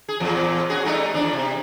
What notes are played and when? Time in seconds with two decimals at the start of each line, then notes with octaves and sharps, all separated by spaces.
0.08 G#4
0.20 E2 A#2 F3
0.69 C#4 F#4 G#4
0.85 G3 A3 D#4
1.14 E2 D4
1.33 C3